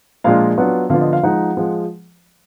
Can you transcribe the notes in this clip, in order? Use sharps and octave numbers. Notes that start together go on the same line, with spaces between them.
A#2 F3 G#3 D4 F4 F5
F#3 B3 D4 F4 F#5
D3 F3 B3 F4 F5
D#5
F5
F3 G#3 D#4 F#5
F3 G#3